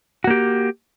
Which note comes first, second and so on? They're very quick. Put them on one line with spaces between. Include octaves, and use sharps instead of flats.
F#4 A#3 G4